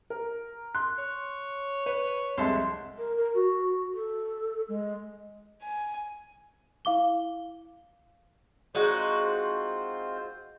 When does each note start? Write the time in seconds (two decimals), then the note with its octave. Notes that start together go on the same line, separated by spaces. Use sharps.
0.10 A#4
0.75 C6 F#6
0.98 C#5
1.86 B4 C#5
2.37 C2 F2 G#3 D4 A4 E5 C6
2.98 A#4
3.17 A#4
3.34 F#4
3.94 A4
4.68 G#3
5.62 G#5
6.85 E4 F5 D6 G7
8.75 G#3 C4 D#4 F4 F#4 C5